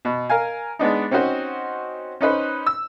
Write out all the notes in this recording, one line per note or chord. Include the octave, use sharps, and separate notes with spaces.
B2
A#4 F5 G#5
G#3 B3 D4 D#4
C4 C#4 D#4 F#4 C5
C#4 D#4 B4 C5
E6